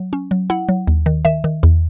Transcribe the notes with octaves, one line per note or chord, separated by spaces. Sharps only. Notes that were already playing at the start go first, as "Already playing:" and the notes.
Already playing: F#3
C#4
F#3
E4 F#5
F#3
D#2
D#3
D#3 E5
D#3
E2